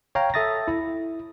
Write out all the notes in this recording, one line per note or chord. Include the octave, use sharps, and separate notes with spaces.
C#5 F5 G5 A#5
A4 E5 D#6 A6 A#6
E4